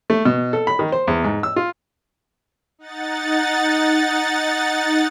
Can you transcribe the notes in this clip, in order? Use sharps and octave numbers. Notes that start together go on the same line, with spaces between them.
A3
B2
A4
B5
D#3
C5
E2
G#2
E6
F4
D#4 F#5 A6